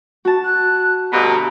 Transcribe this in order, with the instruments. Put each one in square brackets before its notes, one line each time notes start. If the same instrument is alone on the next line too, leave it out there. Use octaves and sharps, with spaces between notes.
[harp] F#4 A5
[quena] F#6
[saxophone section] D2 G2 B2 [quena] A#5